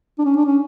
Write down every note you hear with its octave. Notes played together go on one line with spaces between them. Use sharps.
D4
C#4
D4
C#4